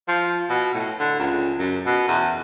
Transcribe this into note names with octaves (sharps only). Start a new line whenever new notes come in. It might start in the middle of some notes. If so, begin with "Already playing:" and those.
F3
B2
A2
D3
C#2
F#2
B2
E2